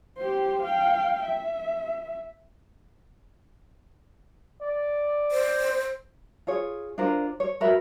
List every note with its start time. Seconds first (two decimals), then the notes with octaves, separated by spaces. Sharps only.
0.18 G4 C5
0.63 F5 G5
1.22 E5
4.62 D5
5.32 C5
6.47 F4 G#4 C#5
6.98 D4 F4 A#4 C5
7.40 C#5
7.60 F#4 A#4 B4 E5